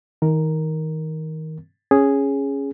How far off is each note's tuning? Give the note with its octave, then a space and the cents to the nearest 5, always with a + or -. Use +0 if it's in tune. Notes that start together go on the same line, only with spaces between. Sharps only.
D#3 +30 A#4 +0
C#4 +0 G#4 +0